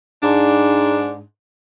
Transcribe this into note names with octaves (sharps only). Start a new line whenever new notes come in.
G#2 D4